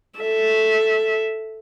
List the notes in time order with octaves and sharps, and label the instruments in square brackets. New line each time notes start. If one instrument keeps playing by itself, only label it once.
[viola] A4 E5